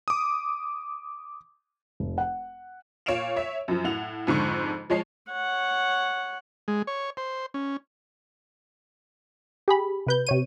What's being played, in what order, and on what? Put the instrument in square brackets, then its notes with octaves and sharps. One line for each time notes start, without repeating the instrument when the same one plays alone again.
[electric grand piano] D6 D#6
[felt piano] F1
F#5
[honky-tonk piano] A#2 C#5 F5 D7 E7 F7
C#5 E5
F#2 F3
A2 F#5 F7
F2 G#2 D3 C#6
F3 G#3 C#5 A5 C7
[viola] C#5 F#5
[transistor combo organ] G#3
C#5
C5
C#4
[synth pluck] G4 G#4 B5
C3 B4 G6
C3 C#5 D#7